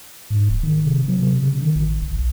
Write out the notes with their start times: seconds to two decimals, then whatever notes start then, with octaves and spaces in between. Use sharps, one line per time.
0.30 G#2
0.49 D1
0.63 D#3
0.85 C3
1.08 F#3
1.22 C3
1.42 C#3
1.61 D#3
1.75 A1
2.02 G1
2.16 B1